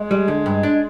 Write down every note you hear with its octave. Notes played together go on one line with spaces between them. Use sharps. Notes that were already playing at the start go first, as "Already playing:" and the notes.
Already playing: G#3
G3
D3
G2
D4